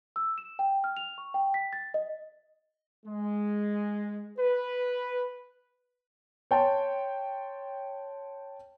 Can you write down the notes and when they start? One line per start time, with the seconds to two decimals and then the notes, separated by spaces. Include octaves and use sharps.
0.16 E6
0.38 E7
0.59 G5
0.84 F6
0.97 F7
1.18 C#6
1.34 G5
1.54 B6
1.73 A6
1.94 D#5
3.06 G#3
4.38 B4
6.51 C#5 G5 A5 C6